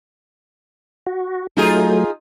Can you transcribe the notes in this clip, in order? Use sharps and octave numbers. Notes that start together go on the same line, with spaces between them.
F#4
F#3 A3 D#4 F4 G#4